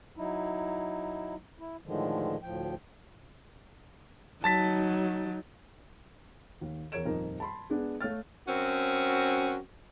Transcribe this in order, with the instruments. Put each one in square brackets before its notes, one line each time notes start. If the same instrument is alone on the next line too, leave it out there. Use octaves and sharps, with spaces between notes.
[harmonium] F#3 D#4 E4
E4
A2 D3 D#3 F3 G#3
D2 A2 F3 G5
[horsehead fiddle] F#3 D#4 [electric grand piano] A5 A6 B6
[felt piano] D#2
E2 A#4 C#5 G#6 D7 E7
D#1 F2 D#4 A#4 D#5
A5 B5 C6
G#3 B3 D4 G#4
A3 C#5 F5 F6 A6
[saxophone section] F#2 C4 C#4 F#4